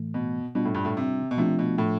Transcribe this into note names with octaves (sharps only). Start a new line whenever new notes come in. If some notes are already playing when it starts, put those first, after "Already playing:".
Already playing: A2 E3 A3
B2
B2 G3 D4 F4
A2
G2
A2
C3
B2
C3 F3 A3 D4 F4
B2
A2